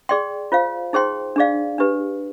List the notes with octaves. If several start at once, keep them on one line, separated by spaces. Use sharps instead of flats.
G#4 D5 G5 C6
F4 C5 F5
D#4 G#4 C5 G5 C6
D4 G#4 D5 F5
D4 G4 B4